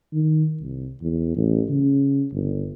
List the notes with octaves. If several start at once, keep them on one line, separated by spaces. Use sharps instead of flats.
D#3
C2
E2
A1
C#3
G1